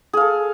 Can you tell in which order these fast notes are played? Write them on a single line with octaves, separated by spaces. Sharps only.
G#4 F5 A4